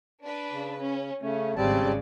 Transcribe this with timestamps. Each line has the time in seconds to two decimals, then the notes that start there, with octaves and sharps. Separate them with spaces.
0.23 D4 B4
0.52 C#3
0.82 C#4
1.22 C#3 A3 C#4
1.56 G#1 C#3 G3 C4 D5 A5